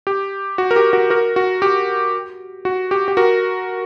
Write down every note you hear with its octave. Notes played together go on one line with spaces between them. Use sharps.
G4
F#4
A#4
G4
F#4 A#4
F#4 A#4
F#4
G4
F#4
G4
G4
F#4 A#4